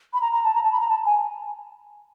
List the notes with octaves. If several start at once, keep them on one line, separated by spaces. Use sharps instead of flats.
B5
A#5
A#5
A5
A#5
A5
B5
A#5
A5
G#5